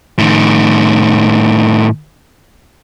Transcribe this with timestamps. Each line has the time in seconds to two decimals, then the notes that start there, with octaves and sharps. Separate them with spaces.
0.18 A2 D#3